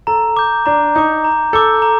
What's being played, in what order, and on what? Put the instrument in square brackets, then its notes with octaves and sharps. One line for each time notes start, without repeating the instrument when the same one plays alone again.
[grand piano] A4 [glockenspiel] A#5
[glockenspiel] D6 G6
[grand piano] D4 [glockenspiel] A#5
[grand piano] D#4 [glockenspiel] D6 G6
[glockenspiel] A#5
[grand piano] A4 [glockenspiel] D6 G6
[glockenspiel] A#5